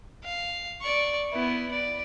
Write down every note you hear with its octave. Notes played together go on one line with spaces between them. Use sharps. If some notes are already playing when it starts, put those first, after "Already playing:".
F5
D5 C#6
B3 E4
D5